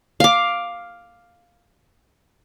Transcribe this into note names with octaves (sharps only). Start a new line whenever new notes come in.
F5 D6